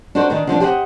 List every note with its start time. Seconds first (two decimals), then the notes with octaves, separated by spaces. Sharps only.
0.15 D4 D#4 F#4 A4 C5
0.30 D#3 D4 A#4
0.47 D3 F3 C4 D4
0.60 G4 G#4 C5 D5 D#5 F#5